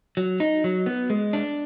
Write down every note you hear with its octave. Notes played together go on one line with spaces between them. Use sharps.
F#3
D#4
F#3
B3
G#3
D4